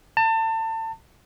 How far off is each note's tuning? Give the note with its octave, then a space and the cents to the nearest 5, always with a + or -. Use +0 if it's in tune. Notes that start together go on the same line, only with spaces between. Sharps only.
A5 +30